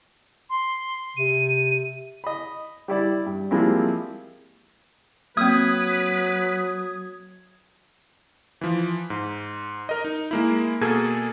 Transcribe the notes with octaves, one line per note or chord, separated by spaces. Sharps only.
C6
C3 D#7
D#5 B5
G3 E4 D5
G2
F3 G3 G#3 A#3 C4 E4
F#3 A#3 C4 B4 D#6 G#6
E3 F3
G#2
A#4 D#5
D#4
G#3 A#3 E4
B2 A#3 G#4 A4 D#6 G#6